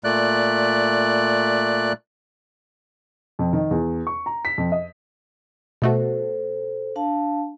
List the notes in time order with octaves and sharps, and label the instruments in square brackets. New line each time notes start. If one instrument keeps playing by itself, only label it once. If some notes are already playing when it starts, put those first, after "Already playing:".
[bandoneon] A#2 A3 D5 F#6
[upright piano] F2
D#3
E2
C#6
A#5
B6
F2
D#5
[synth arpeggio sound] B2 A3 F#4 [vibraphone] A4 C5
[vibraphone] D4 F5 A5